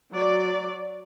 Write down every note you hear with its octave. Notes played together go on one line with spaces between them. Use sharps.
F#3 D5